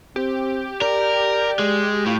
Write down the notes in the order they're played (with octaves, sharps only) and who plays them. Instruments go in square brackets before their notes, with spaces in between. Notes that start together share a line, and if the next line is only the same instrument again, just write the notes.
[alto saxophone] C4 [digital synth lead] G4
[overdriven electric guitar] A#4 [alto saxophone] D5
[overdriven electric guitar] G#3
[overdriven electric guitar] A2 [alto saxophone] F4